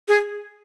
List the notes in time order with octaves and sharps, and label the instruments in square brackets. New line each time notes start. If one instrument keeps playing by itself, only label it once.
[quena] G#4